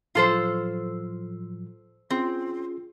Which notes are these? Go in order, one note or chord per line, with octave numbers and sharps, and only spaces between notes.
A2 F3 F#3 F4 A4 C5
C4 C#4 F4 G#4